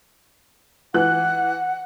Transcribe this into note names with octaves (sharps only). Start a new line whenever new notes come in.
E3 F#5 F#6